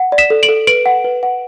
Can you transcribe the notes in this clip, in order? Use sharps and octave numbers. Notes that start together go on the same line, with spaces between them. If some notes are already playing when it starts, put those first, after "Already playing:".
Already playing: F#5
D5
B6 E7
A4
D7 F#7
A4
B4 D7 F#7
F#5
B4
F#5